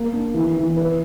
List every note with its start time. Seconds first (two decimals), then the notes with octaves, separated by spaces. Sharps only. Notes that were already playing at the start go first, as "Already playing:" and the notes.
Already playing: A#3
0.13 D4
0.34 E3
0.56 E3
0.77 B4